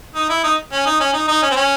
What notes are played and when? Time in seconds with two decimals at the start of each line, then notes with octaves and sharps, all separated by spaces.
0.15 D#4
0.29 E4
0.44 D#4
0.72 C#4
0.86 D#4
1.00 C#4
1.13 D#4
1.28 D#4
1.42 C#4
1.51 C4
1.56 C#4